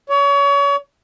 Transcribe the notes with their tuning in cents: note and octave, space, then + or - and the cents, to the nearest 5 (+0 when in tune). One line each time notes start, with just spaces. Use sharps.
C#5 +30